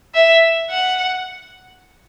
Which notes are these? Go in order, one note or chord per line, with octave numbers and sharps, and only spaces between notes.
E5
F#5